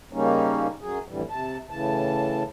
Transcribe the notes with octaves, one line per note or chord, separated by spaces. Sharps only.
C#3 G3 A#3 C#4 D#4
F#2 F#3 G#4
F2 A2 D3 E3 G3
C3 A5
A2 C#3 E3 A5